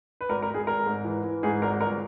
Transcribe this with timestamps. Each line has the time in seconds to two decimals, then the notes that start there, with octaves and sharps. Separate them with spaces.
0.21 B4
0.29 G#1 A#4
0.42 A#4
0.49 G#1
0.54 G#4
0.67 G#1 A#4
0.86 G#2
1.05 E3
1.24 E3
1.43 G#2 G#4
1.62 G#1 A#4
1.81 G1 A#4